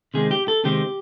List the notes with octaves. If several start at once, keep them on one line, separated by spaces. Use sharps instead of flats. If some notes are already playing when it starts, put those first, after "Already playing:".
C3 D#3 G#3 C4 G#4
G4
A4
C3 D#3 G#3 C4 G4